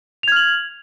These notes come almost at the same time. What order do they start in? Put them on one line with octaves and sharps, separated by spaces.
F7 G#6 F6 F#7